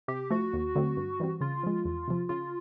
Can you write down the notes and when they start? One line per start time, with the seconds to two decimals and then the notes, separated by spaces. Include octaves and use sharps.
0.08 C3 G4
0.31 F3 A3 F#4
0.53 D#2
0.75 D3 F#3 A3 C4
0.97 G2
1.20 E3 G3 C4
1.41 C#3 F4
1.63 F3 G#3
1.85 E2
2.08 C3 F3
2.29 C#3 F4